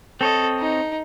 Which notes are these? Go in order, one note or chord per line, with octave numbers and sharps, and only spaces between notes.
C4 A4 C#5 D#5
D#4